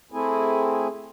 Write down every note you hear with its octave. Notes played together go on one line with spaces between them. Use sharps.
A3 C4 E4 G#4